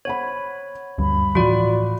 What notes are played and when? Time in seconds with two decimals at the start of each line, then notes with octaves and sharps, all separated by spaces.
0.05 C5 C#5 F#5 B5
0.98 D2 G2 B5
1.35 A2 E3 F3 F4 F#4 D5